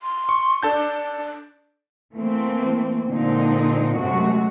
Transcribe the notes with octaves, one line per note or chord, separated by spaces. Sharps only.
C6
C#6
D4 A4 A5 G6
E3 A3 A#3 C4
A#2 D3 F3 G#3 C4 D#4
F#2 C3 G#3 A3 F#4